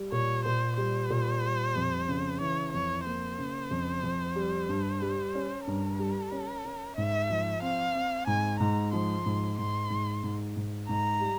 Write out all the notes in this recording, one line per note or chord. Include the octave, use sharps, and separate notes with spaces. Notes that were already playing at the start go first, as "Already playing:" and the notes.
Already playing: G3
A#2 C#5
A#2 C5
G3 C5
A#2
G3
F2
C#3
E3 C#5
F2 C#5
A#3 C5
C#3
F2
F2
G3
G2
G3
C#4
G2 A#4
G3
C#4
C#4
G#2 E5
F3
C4 F5
C4
G#2 G#5
G#2 A#5
F3 C6
G#2
G#2 C6
G#2
G#2
G#2
G#2 A#5
G3